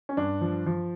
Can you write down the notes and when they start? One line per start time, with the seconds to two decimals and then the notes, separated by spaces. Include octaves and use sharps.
0.09 C#4
0.17 G2 D4
0.41 F3
0.66 F3